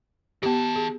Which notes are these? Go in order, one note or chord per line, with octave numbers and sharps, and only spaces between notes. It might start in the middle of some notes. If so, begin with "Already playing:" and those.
D#3 B3 G4 A5
G#4